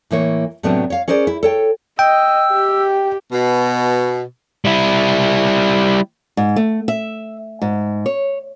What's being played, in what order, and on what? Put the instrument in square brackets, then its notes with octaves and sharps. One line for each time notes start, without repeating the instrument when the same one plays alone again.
[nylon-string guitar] A2 E3 A#3 C#5
A2 C3 F#3 B3 C4 D4
C#5 F5
C#4 G#4 A#4 C5 D5
E4
A4 C#5 G5
[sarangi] D#5 [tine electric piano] G5 [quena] E6
[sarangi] G4
[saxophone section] B2
[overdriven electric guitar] G3 E4
[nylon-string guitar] G#2
A3
E5
G#2
C#5